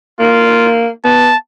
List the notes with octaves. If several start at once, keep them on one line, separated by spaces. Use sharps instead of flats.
A#3 F4
B3 A5